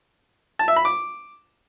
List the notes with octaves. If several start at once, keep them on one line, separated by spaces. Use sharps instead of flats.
A5
E5
B5
D6